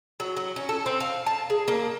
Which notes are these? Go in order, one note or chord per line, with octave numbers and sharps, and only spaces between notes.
F#3
F#3
C#4
A4
C4
F5
A5
G#4
A#3